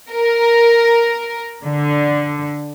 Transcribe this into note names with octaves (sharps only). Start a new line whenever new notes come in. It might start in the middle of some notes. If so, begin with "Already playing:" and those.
A#4
D3